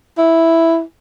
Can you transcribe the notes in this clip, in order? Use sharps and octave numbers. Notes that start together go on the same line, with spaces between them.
E4